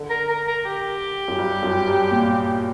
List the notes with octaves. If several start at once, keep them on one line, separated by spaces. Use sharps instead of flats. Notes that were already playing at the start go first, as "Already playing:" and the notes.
Already playing: D3
A#4
A#4
A#4
G4
F#2
G2
F#2
G2
A#2